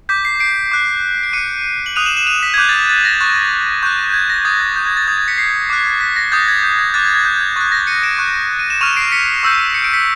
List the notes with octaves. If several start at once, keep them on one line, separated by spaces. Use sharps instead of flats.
D6 G6 B6
C7
C7 D7
D6 F#6
D7
D6 F#6 C#7 D#7
F#7
D#6 F#6 D#7 F7
E7 F#7
E7 F#7
D#7 F7
B6
G#6
D6 F#6 G6
A6
G#6
A6
A#6
C#6 F#6 A6
C#6 F#6 G6
G6
G#6
A#6
D#6 G6 A6
G#6
G6
G#6
A6
D#6 G6 G#6
G#6
B6 C#7
C7
D6 F#6
B6
A#6
D#6 G6 A6
G#6
G6
G#6
D6 F#6 A6
G#6
G#6
G6
G6
G#6
C#6 F#6 A6
A#6
C#7 D#7
D7 E7
C#6 F#6
D#7
E7
C#6 F6 D#7 F7
C7 D7
B6 C#7
C#6 E6 G6
C#7
D7
B6 C#7